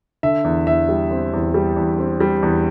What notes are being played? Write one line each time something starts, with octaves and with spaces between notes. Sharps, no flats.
D3 E5
E2
E2 E5
G3
C4
E2
G3
E2
C4
G3
E2